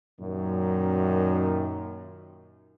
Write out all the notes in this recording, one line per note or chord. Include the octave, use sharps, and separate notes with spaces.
F#2 A#2 D#3